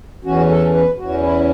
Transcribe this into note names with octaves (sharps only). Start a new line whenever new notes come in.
E2 E3 C#4 F#4
A4
B4
E2 E3 C#4 F#4
E4